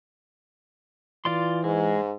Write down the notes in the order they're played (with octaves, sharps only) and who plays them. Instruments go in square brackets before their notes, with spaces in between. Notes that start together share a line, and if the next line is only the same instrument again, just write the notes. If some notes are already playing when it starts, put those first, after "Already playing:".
[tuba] E3 [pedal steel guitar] F4 D5 C6
[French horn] G#2 [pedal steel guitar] G#3